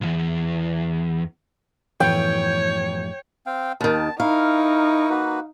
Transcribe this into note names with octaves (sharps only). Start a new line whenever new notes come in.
B1 E2
F#2 A2 E3 F3 A3 B3 C#5 G5
C4 F5 G5
D#2 D#3 A5
D#4 E4 A#4 F5 C#6
A#3 F#4 B4